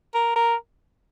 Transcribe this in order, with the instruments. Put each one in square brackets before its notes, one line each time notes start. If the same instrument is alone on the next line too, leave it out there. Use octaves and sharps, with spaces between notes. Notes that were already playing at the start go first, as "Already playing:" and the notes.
[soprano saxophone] A#4
A#4